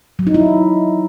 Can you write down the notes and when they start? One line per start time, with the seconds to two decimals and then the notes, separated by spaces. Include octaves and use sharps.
0.19 F#3
0.27 D#4
0.34 E4